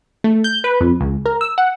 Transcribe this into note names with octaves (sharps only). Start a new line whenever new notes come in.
A3
G6
B4
F2
C#2
A#4
E6
F#5